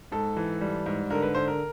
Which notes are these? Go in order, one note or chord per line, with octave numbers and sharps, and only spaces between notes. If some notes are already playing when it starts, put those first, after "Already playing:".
G#2 A4
E3
G3
G#2
D3 A#4
B4
D3 C5
A#4